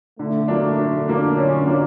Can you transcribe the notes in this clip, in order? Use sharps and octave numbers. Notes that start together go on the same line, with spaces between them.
D3 A3
F#3 A#3 D4
D3
F#3 A#3 D4
D3 C#4
F#3 A#3 D4